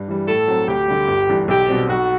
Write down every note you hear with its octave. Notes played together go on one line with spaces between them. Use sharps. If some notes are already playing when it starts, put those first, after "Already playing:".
Already playing: G2
E3 G3
A2 A4
F#3 C4
D2 G4
D3 G3
G1
G2 E3
B1 G4
B2 G3 C4
B1 F#4